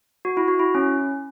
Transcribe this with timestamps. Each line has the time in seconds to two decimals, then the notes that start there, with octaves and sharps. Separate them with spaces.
0.25 F#4
0.37 E4
0.48 F#4
0.59 E4
0.75 C#4